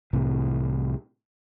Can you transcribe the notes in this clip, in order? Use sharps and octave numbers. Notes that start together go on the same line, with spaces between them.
C2 A2 C3 E3